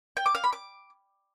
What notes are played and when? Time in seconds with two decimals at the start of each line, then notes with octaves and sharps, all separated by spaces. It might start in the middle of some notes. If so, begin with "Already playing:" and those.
0.17 G5
0.26 D6
0.35 F5
0.44 B5
0.53 D6